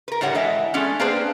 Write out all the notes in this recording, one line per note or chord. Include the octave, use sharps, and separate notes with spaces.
A#4 B4
A2 D3 G3 C#5 F#5
E3 G#3 D#5 E5
G#3 A3 B3 C#4 D4
A#3 C4 D4 G#4 B4 C5